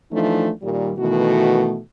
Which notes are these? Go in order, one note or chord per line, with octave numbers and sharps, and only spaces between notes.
E3 F3 A3 D4 D#4
A#2 D#3 G3
B2 D#3 E3 A3 F#4